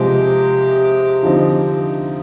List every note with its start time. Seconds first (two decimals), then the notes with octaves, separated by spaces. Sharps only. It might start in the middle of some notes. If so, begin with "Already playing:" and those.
Already playing: C3 F3 G#3 G4
1.22 D3 F3 C4 D#4